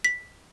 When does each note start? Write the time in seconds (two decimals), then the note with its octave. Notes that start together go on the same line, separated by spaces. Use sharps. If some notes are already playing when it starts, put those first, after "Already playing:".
0.04 B6